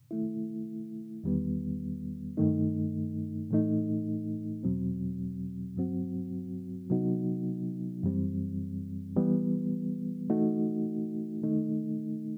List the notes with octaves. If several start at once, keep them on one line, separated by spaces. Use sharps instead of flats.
D#3 A3 E4
E2 D#3 G3 B3
G2 D#3 A3 D#4
A2 E3 A3 D#4
E2 B2 F#3 C4
G2 F#3 C4 F#4
C3 F#3 B3 D#4 F#4
F#2 E3 G3 C4
E3 G3 B3
E3 A3 D#4 F#4
D#3 A3 D#4